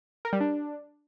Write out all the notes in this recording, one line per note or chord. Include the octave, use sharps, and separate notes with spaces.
A#4
G3
D4